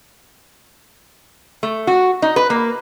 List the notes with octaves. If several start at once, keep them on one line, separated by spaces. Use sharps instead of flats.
A3
F#4
D#4
B4
A#3